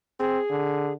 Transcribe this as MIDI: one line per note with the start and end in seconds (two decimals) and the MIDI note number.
0.19 0.39 60
0.19 0.93 68
0.50 0.93 50